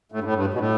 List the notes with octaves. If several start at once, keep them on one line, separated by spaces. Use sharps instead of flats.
A2
G2
A2
G2
B2
A2